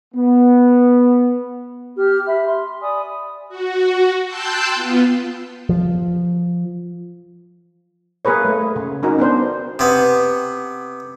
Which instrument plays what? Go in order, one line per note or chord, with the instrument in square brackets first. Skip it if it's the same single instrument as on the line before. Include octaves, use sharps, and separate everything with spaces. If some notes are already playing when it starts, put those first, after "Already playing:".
[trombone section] B3
[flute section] G4 F6
E5 B5
C6
D5 G#5 B5 D#6
[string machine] F#4
G5 A5 C6 E6 F#6 G6
B3 F4
[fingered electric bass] F3
[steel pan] A#3 G#4 A#4 B4 C#5
A3
C#3
C#4 D#4 F#4 A#4
B3 D4 C5
[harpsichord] C3 B3